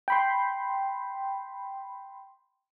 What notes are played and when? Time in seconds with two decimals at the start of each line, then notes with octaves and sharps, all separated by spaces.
0.08 G5 B5 C6